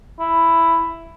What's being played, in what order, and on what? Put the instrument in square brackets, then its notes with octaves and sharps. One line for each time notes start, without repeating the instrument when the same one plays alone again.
[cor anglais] E4